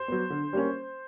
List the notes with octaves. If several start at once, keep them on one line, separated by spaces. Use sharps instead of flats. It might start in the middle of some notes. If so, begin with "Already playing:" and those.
Already playing: C5
F#3 B3
D3
G3 A#3 C#4